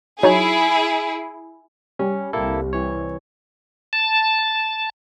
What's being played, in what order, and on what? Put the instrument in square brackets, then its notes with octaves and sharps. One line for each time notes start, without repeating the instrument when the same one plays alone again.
[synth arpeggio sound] F#3 D#4 C#5 [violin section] E4 G#4
[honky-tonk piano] G3 [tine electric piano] C#4
[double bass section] C2 [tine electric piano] A#3 E4 A4
[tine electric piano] E3 C#5
[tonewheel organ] A5